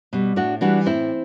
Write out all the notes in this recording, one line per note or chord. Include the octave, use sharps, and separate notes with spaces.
B2 G3
A2 D4 F#4
E3 G3 D4 F#4
A2 C4 E4